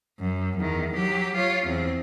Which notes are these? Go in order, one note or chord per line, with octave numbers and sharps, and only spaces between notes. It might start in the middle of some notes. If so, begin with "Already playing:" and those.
F#2
E2 D#3
F#3 G4
F4 C#5
E2 C4